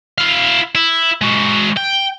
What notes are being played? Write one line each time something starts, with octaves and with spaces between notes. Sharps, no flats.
E4 F5
E4
G#3 F#4
G5